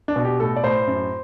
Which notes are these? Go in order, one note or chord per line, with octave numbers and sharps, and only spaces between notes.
D4
B2
G4
A2 A4
D5
A2 C5
F#2